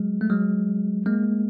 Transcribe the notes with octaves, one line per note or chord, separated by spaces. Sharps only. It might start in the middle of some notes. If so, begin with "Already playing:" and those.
Already playing: F#3 G#3
A3
F#3 G#3
G#3 A#3